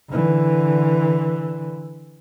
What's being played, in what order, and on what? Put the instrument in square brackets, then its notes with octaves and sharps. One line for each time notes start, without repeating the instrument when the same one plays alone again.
[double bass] D3 E3